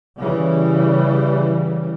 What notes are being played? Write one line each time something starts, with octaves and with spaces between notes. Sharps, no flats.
C#3 E3 G3